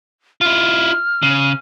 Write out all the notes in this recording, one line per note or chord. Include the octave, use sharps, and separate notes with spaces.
E4 F4 F6
C#3